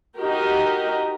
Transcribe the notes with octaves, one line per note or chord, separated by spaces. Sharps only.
D#4 F#4 G4 A#4